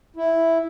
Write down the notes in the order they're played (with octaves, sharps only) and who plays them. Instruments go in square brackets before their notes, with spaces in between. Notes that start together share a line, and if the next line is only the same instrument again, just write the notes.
[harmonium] E4